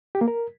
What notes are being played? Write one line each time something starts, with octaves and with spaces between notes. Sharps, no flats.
G4
A#3
A#4